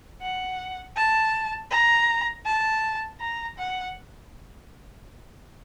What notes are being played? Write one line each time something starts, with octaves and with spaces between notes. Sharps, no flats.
F#5
A5
A#5
A5
A#5
F#5